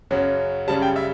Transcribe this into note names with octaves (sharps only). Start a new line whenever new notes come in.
F#2 C#3 F#3
F#2 C#3 G3 A5
G5
E5